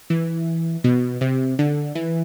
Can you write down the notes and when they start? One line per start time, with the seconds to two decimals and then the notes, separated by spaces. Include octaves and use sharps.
0.10 E3
0.84 B2
1.21 C3
1.59 D3
1.95 E3